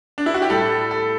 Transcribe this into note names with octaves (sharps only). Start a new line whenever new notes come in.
D4
E4
F#4
G4
A2 G3 A4
A4